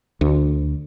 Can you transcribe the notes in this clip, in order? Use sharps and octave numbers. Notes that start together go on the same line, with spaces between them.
D2